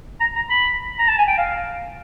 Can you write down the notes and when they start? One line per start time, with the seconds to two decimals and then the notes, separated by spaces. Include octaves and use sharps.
0.21 A#5
0.36 A#5
0.50 B5
0.99 A#5
1.08 A5
1.18 G#5
1.28 G5
1.38 F5